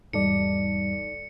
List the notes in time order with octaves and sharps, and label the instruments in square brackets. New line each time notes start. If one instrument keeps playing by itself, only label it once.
[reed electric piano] E2 G#2 G3 [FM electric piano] D#4 A4 D5 [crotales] C#7